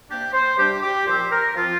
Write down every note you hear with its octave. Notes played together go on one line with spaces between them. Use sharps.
C3 A#3 D4 G4
C5
C3 G3 D4 G4
G4
A#2 F3 C4 C5
A#4
F3 C4 F4